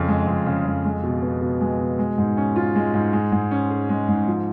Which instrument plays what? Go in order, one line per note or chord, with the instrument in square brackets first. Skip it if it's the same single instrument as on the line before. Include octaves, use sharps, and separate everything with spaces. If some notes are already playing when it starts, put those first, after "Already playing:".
Already playing: [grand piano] F2 C#3
G#3
F2
C#3
F2
G#3
B2
B3
B2
G#3
B2
G#3
G#2
C#4
F4
G#3
G#2
G#3
G#2
C#4
G#4
G#3
G#2
F3